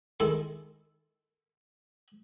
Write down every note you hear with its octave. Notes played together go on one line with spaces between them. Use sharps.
D#3 G#3 E4 A4